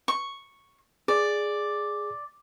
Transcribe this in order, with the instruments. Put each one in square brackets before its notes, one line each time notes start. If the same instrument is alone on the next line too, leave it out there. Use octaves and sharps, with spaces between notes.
[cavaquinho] C#6
[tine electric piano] G#4 [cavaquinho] D5